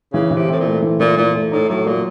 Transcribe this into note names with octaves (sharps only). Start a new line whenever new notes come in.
C#3 E3
E3
C3
A2 C4
A#2
A3
E3
A#2 E3
A#2 E3
A3
A2 D#4
A2 F#3
A#2 F#3